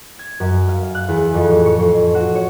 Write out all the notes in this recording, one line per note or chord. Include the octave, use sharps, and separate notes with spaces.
G#6
F#2
F5
F#6
E2
F2
A2
C#6
F2
F#4
C#5